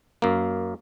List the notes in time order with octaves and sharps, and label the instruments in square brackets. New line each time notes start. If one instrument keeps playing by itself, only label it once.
[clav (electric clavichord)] F#2 A#3